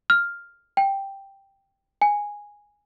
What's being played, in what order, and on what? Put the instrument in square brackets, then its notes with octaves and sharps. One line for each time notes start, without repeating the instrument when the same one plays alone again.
[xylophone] F6
G5
G#5